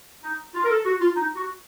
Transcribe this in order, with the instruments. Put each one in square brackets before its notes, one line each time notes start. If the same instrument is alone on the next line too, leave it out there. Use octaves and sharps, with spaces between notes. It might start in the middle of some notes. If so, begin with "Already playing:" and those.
[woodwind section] D#4
F4
A#4
A4
F#4
F4
D#4
F#4